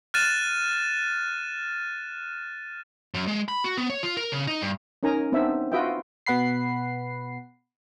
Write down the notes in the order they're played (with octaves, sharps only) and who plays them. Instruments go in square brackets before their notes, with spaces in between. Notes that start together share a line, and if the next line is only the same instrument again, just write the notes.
[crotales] F6 F#6 A6 D#7 E7
[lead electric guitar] F#2
G#3
B5
F#4
B3
C#5
F4
A#4
C#3
D#4
G2
[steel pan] C#4 D#4 A#4 G#5 A#5
B3 C4 D4 D#4 E5
F4 F#4 B4 D#5 E5 G5
[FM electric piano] B2 B3 F#5 B5 C7